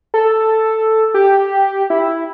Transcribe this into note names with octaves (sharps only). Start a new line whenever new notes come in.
A4
G4
E4